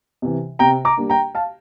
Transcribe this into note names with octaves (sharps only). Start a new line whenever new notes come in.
C3 E3
C3 G5 A#5
A#5 D6
G3 A#3 D4
G5 A#5
F5 A5